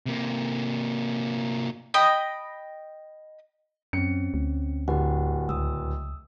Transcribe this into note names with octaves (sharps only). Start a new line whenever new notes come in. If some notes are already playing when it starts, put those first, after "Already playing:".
C3 A#3
D#5 G5 B5 D#6
F#2 C4 C#4 C#7
D2
D1 G4 F#5
C#2 D#6 E6